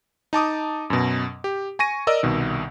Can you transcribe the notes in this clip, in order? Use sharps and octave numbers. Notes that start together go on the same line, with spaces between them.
D#4 A5 D6 D#6
F#2 B2
G4
G#5 C#6 A#6 D#7
A#4 D5 D#5 E6
C2 B2 D#3